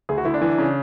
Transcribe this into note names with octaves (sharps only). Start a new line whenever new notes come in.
D2 G#4
F#4
D2 E4
D4
E3
C#3